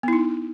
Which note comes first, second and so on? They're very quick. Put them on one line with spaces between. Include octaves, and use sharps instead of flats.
B3 E4 D#4